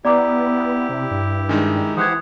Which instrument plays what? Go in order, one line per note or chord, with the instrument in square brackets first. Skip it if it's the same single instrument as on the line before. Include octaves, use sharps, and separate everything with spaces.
[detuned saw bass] B3 [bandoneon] E4 G4 [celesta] D5 A#5 D6
[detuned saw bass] C3
G2
[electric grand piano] D#3 G#3 D#4 [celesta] D4
[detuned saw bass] E3 [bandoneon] G4 C5 F#5 [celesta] D#6 F#6 G#6